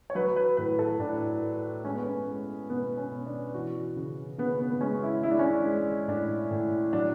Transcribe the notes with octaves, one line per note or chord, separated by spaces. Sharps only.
C#5
F#3 B4
B4
A2 B4
A4
A2 D4
A3
G#3 C#4
B3
C#4
G#3
B2 B3
C#4
B2
D4
E3 F#4
C#3
C#3 B3
B3
B3
G#3 C#4
E4
G#3 E4
D4
C#4
D4
G#3
A2 D4
A2
F#3 D4